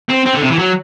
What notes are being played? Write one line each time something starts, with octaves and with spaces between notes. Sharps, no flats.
C4
C4
D3
C3
E3
F#3